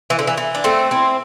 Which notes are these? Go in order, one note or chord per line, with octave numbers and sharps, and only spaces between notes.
E3
D3
E3
E3
D4
A3 C4
C4 E4